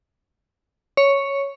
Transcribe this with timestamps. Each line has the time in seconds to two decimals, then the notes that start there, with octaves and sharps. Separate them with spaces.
0.97 C#5